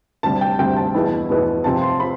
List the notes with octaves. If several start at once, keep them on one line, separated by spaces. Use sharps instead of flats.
D2 C3 G3 A5
G5
D2 C3 G3 G5
A5
E2 B2 B3 E4
E2 B2 B3 E4
C2 C3 F3 C4 F4 A5
C6
C4 F4 B5